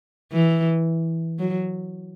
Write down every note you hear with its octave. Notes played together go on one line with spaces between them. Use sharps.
E3
F#3